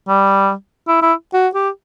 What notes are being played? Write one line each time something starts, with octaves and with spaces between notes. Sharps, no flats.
G3
E4
E4
F#4
G4